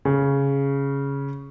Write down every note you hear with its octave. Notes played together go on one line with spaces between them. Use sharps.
C#3